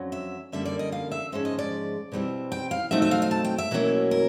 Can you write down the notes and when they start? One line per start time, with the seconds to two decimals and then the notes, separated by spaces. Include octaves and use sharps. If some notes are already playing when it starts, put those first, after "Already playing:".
Already playing: F2 D3 F#3 C#4
0.12 E5
0.52 F#2 D3 G3 A#3 E5
0.65 D5
0.79 D#5
0.92 F5
1.12 E5
1.32 G#2 F3 G#3 C#4 E5
1.45 D#5
1.59 D5
2.12 B2 G3 C4 E4
2.52 G5
2.71 F5
2.91 B2 F#3 A3 C4 D#4 E5
3.02 E5
3.11 F5
3.22 F5
3.31 A5
3.45 G5
3.58 E5
3.71 B2 F#3 A#3 C#4 E4
4.11 A#4